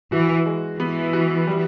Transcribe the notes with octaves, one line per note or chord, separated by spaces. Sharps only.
E3 F#4
G#3
E3 B3
F#4
G3